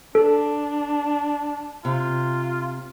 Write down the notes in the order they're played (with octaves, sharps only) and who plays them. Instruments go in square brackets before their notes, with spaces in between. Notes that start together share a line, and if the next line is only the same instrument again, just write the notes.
[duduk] D4 [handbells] A4
[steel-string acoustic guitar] C3 [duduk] F4